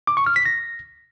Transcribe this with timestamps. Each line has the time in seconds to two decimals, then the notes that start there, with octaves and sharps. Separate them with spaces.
0.07 D6
0.17 C#6
0.26 F6
0.36 B6
0.46 A#6